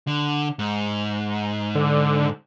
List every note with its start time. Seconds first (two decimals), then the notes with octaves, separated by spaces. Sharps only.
0.07 D3
0.59 G#2
1.75 D3